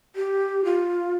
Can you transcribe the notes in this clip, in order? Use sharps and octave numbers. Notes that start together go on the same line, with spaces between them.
G4
F4